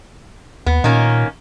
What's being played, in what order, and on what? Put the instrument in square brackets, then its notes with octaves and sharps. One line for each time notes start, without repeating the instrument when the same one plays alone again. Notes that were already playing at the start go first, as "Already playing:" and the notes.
[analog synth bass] D#2 [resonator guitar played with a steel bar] B3
[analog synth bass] A#2 [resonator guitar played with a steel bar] D#3 A#3 C#4